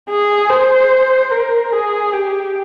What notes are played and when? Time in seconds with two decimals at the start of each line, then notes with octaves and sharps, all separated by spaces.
0.10 G#4
0.50 C5
1.31 A#4
1.72 G#4
2.13 G4